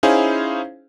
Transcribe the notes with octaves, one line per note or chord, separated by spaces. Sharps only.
C#4 D#4 E4 G#4 C5 F5